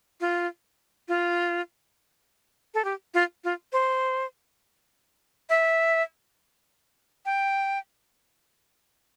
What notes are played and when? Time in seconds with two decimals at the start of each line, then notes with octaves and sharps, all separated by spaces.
0.21 F4
1.08 F4
2.74 A4
2.85 G4
3.14 F4
3.44 F4
3.73 C5
5.50 E5
7.26 G5